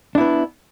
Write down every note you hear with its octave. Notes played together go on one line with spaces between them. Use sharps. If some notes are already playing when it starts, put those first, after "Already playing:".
B3 D4 E4